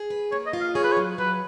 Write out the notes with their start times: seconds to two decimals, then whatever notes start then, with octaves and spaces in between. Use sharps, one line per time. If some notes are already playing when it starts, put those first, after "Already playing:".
Already playing: G#4
0.10 B4
0.32 A#3 C#5
0.46 D#5
0.53 F4
0.61 F5
0.75 G#4 C#5
0.84 B4
0.92 C#5
0.97 F#3
1.18 F#3 B4